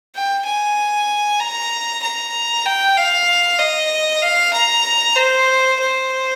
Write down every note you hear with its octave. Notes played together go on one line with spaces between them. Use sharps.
G5
G#5
A#5
A#5
G5
F5
D#5
F5
A#5
C5
C5